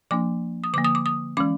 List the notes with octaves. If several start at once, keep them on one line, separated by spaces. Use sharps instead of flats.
F3 A#3 D4 D6
D#6
D3 F3 A#3 D6
D#6
D6
D#6
E3 G#3 C#4 D6